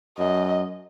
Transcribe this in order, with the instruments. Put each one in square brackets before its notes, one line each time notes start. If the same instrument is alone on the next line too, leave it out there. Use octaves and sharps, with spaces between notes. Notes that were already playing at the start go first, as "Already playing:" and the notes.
[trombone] F#2 [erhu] D#5